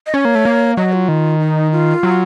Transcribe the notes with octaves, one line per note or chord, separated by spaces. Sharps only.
D#5
C#4 C#5
A#3
A3
A#3
F#3 D#5
F4
D#3
D#4
F4
F#3